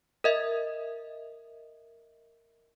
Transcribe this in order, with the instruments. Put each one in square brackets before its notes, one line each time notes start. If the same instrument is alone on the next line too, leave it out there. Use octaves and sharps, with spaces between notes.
[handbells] A#4 D#5 E5